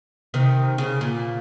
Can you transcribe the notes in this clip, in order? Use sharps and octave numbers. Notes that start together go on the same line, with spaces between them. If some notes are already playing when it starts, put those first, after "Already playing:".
C3 D#3
C#3
A#2